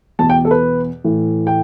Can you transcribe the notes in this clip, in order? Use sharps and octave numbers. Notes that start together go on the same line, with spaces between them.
E2 B2 A5
G5
A4
B4
A2 E3
G5